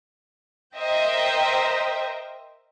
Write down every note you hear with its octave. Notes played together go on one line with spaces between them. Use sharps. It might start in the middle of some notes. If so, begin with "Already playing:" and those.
A#4 C5 D#5 E5 G5